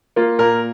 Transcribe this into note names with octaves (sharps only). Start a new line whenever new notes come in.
A#3 F4
A#2 A#4